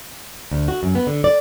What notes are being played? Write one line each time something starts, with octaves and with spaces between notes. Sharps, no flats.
D2
F#4
F#2
B3
D3
D5